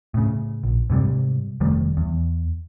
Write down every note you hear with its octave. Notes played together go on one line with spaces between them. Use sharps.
A2 C#3
A#1
G#2 C3 D#3 G3
F1 D#3 G3 A3
E2